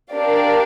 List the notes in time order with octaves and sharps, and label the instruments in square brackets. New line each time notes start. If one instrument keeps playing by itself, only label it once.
[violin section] D4 G4 A#4 D5 F5